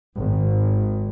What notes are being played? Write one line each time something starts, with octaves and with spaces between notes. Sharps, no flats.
G#1